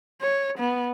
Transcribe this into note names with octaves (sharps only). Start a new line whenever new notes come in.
C#5
B3